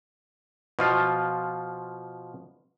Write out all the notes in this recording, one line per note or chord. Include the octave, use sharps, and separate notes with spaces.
B2 F3 F4